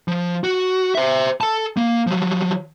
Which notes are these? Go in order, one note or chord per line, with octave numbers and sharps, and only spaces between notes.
F3
F#4
C5 E5
A4 A5
A#3
F3 F#3